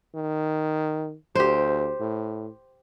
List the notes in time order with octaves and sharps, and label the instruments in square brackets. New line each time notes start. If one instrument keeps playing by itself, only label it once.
[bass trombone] D#3
[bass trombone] D2 [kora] G4 C5
[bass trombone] A2